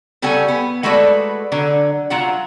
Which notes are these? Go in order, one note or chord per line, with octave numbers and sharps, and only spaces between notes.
C#3 G3 C#4 A4 F#5 G#5
B3
G#3 A3 F#4 A4 B4 D5
D3 F#3
F#3 F4 F#5